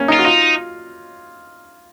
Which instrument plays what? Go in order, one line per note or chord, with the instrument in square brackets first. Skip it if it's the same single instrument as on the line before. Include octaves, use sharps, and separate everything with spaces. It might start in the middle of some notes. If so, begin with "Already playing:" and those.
Already playing: [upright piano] A#3 C#4
D#4
[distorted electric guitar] F4
[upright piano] F#4
[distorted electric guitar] D#4 [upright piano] F4